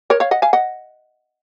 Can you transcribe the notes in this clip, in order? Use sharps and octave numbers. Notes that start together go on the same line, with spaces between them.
A#4 C#5
C#5 F5
D#5 F#5
F5 G#5
D#5 F#5